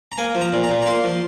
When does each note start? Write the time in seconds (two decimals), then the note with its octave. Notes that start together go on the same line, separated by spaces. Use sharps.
0.12 A#5
0.18 A#3 G#5
0.35 F3
0.41 A#5
0.53 A#2
0.63 A#5
0.69 A#2
0.82 A#5
0.86 A#3 C6
1.04 F3